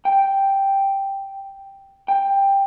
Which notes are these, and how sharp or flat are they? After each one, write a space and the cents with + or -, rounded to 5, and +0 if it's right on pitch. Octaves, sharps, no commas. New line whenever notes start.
G5 +0
G5 +10